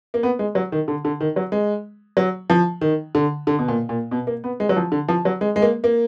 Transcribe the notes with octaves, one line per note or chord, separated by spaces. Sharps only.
A#3
B3
G#3
F#3
D#3
D3
D3
D#3
F#3
G#3
F#3
F3
D#3
D3
D3
B2
A#2
A#2
B2
A#3
B3
G#3
F#3
F3
D3
F3
F#3
G#3
G#3
A#3
A#3